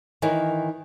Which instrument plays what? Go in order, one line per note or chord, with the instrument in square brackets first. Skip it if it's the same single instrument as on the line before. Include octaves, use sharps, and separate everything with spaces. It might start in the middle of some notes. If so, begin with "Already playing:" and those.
[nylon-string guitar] D#3 E3 E4 A#4 C#5